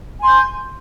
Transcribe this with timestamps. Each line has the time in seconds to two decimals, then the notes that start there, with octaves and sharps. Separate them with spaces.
0.20 G#5
0.24 C6
0.27 G6